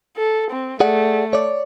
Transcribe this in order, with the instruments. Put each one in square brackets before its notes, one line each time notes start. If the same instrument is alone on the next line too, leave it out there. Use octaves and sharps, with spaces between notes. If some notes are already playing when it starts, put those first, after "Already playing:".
[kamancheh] A4
C4
[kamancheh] A3 [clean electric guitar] G#4 D5 F#5
[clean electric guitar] C#5 D5